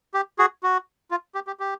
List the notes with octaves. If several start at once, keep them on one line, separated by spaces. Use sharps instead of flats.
G4
F#4 G#4
F#4
F4
G4
G4
G4